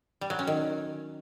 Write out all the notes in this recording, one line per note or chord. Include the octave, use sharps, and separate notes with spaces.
G3
F#3
C#4
D#3